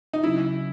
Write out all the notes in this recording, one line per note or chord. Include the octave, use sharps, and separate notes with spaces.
D#4
C#3 F#3 C#4 E4